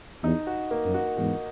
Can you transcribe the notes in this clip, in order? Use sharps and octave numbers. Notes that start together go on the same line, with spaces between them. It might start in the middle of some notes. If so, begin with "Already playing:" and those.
E2 D#4
F#4
A#3
F#2
F#4
E2 G#2 F#4